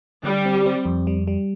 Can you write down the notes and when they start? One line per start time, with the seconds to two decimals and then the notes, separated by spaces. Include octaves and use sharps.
0.24 D3 G3
0.45 C4
0.66 C4
0.86 F2
1.07 G3
1.27 G3